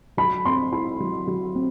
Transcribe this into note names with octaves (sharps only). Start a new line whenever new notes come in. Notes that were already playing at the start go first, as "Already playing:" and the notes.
F#3 B5
C4 C6
E4 B5
F#3
F#3
C4